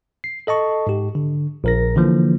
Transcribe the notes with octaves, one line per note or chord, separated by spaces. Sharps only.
C7
A4 D#5 A5 C#6
G#2 G4
D3
A#1 A#4 A#6
D3 E3 F3 A#3